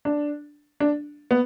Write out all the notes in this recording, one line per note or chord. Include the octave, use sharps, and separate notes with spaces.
D4
D4
B3